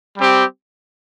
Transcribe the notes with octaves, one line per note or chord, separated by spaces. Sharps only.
G3 C4 G4